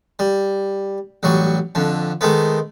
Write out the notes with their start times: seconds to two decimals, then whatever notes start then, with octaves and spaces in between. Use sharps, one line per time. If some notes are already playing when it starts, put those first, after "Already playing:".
0.19 G3
1.23 A1 F#3 G3 C#6
1.75 F2 D3
2.21 D#3 G#3 A3 B3